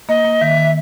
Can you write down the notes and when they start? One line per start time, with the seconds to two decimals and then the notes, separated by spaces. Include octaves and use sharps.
0.09 A#3 D#5
0.25 A#3
0.41 D#3 E5
0.58 D#3